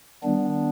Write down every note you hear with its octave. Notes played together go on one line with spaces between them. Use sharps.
D#3 G3 B3 D4